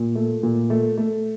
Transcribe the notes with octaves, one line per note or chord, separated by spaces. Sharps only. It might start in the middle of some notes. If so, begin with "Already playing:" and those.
Already playing: A#2
A3
A#2
A3
A3